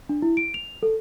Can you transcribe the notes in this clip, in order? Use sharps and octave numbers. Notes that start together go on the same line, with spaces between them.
D4
E4
D7
F7
A4